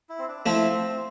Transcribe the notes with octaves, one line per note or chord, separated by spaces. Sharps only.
E4
C4
D4
F3 A3 C4 E4